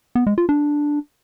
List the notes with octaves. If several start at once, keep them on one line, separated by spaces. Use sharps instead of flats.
B3
G#3
F4
D4